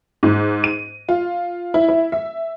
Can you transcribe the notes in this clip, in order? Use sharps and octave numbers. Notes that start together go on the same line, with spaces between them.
G#2
D#7
F4
E4
E4
E5